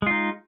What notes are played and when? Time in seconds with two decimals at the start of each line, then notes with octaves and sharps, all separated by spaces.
0.02 G#3
0.07 F4
0.11 D#4